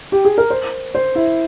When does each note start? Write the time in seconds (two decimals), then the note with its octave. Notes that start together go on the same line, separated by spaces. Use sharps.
0.12 G4
0.25 G#4
0.38 A#4
0.50 C5
0.95 C5
1.15 E4